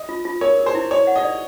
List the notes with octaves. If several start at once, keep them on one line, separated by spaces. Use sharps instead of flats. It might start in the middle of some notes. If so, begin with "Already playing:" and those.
Already playing: D#5
F4
F4
A#4 C#5
A#4
C5
E4
C#5 D5
F#5
D#5
D5